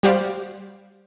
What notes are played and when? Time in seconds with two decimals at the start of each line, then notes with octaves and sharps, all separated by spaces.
0.03 G3 F#4 G4 C5 D5 F5